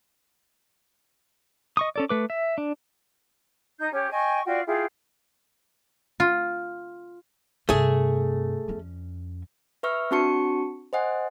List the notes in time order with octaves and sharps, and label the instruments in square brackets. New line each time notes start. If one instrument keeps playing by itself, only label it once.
[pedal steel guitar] D#5 C#6 D#6
C#4 A4 D5
A3 B4 D6
E5
D4
[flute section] D#4 G6
C#4 G4 C#5
D#5 G5 G#5 C#6
F4 F#4 D5 G5
E4 F4 G4 G#4
[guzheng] F4
[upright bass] G2 C3 [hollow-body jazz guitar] A3 G#4
[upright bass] F2 C#4
[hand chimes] B4 E5 C#6 E6 F6
C4 D4 F#4 A5 C#6 C#7
C5 D#5 F#5 G#5